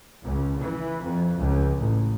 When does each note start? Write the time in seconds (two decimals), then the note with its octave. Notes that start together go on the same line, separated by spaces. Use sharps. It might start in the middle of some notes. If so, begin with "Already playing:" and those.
0.23 C#2
0.60 E3
1.03 F2
1.37 C#2
1.80 A1